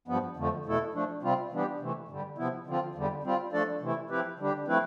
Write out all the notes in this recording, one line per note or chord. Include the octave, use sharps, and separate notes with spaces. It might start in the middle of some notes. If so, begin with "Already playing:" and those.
G2 F3 B3
F2 D3 F3 A3
E2 B2 A3 E4 A4
F3 A3 D4
C3 G3 C4 F4
E3 G3 B3 D4 G4
C3 E3 A3
G2 D3 G3
C3 F3 B3 E4
D3 F3 C4 F4
E2 D3 G3
G3 C4 F4
F3 A3 D4 A4 D5
C3 E3 A3 E4
F3 C4 E4 G4 B4
D3 G3 D4 G4
F3 A3 C4 E4 B4